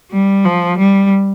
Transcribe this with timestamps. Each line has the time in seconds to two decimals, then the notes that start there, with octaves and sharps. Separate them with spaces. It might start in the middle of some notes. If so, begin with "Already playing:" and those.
0.12 G3
0.45 F3
0.79 G3